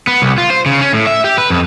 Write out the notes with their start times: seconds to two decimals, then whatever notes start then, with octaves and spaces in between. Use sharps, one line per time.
0.07 B3
0.22 C2
0.38 F4
0.50 C5
0.66 C#3
0.81 C#4
0.93 A2
1.07 E5
1.24 G4
1.38 B4
1.50 F2